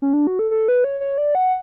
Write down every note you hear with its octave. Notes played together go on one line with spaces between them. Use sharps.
C#4
D4
F#4
A4
A4
B4
C#5
C#5
D5
F#5